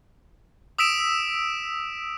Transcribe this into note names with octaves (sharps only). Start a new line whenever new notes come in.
D#6 E6 B6 D7 E7